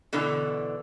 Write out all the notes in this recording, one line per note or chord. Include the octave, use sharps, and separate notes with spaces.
B2 D3 E3